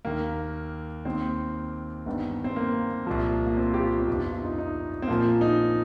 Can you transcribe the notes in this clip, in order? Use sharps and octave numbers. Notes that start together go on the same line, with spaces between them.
D#2 D#3 A#3
D#2 D#3 C4
G1 G2 D#3
C4
A#3
C2 A#2 F3
A#3
C4
G4
F4
C4
G1 F2 C3 F3 D#4
F4
F4
D#4
D#4
C4
A#1 A#2 F3 A#3
D#4